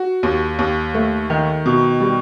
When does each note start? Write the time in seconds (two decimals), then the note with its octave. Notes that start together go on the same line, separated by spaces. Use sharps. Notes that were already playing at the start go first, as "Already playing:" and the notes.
Already playing: F#4
0.23 D#2
0.59 D#2
0.94 A3
1.30 D#3
1.66 B2
2.00 G3